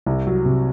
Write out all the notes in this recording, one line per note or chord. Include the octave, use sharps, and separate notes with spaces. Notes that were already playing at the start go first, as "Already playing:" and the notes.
C2
F#3
C3